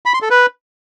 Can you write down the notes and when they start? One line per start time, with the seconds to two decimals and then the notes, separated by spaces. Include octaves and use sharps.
0.06 B5
0.14 C6
0.22 A4
0.30 B4